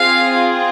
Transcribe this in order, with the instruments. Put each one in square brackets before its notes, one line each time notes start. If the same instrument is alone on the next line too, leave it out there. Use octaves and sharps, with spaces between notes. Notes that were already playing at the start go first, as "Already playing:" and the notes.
Already playing: [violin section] C4 F4 G#4 F5